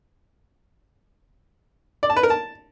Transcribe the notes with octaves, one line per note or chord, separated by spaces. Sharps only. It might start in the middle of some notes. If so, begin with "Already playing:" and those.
D5
A5
B4
A#4
A5